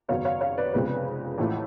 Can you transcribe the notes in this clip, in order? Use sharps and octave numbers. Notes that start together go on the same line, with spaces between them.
G#1 F#2 C#3 F#3 B3 C#5 F5
C#5 F5
C#5 F5
B4 D5
F1 F2 C#3 G#3 B3 B4
A1 A2 F3 A3